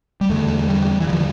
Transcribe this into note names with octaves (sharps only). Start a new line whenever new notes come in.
G3
E2 D3 A3
G3
E3
E2 D3 F3